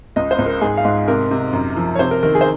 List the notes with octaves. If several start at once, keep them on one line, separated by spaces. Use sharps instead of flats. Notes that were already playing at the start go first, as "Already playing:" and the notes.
C#2 D#5
C5
C#2
A#4
G#2 G#4
F5
G#2
C3 A#4
C3
F#2
F3
C#5
C3 C5
A#4
D#3 A#4
G#4
C5